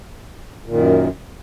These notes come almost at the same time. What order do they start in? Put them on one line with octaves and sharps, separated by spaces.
A#2 D#3 F#2